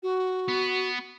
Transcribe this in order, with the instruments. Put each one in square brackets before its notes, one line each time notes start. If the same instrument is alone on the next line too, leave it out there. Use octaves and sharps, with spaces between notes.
[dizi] F#4
[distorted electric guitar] B3